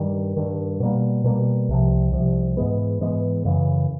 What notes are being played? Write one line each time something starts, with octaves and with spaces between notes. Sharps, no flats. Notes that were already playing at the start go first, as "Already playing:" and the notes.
Already playing: G2 D#3 G3
G2 D#3 G3
B2 G3 A#3
B2 G3 A#3
C2 C3 F3
C2 C3 F3
G#2 E3 G#3 B3
G#2 E3 G#3 B3
F#2 C#3 E3